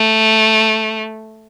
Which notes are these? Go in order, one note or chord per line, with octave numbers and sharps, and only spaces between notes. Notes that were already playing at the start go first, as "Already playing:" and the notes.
Already playing: A3